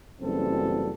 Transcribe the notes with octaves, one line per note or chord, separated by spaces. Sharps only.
F#1 F#2 E3 G3 C4 A4